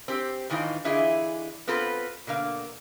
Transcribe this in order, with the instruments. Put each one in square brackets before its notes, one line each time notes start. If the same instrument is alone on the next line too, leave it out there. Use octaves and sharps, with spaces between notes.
[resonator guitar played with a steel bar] C4 G4
A2 D#3 E3 D#4 F4
D3 E3 E4 F4 G#4 D#5
B3 C4 F4 A4 B4
B2 D3 A#3 F5